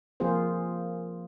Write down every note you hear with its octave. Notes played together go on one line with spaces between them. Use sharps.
F3 A#3 C4 F4 G#4 C5